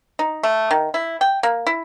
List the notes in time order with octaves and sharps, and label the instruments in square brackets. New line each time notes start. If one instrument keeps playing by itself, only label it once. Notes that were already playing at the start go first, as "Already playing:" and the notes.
[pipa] D#4
A3
D#3
E4
G5
A#3
E4